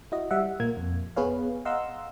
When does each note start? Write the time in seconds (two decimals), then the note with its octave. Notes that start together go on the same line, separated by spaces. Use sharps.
0.12 E4 F#4 D#5
0.31 G3 E5 F#5
0.60 A#2 A#3 G#6
0.77 F2
1.16 B3 G#4 B4 C#5 F5
1.65 D#5 F5 F#5 A#5 C6 E6